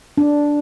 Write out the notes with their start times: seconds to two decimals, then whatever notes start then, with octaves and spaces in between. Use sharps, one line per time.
0.18 D4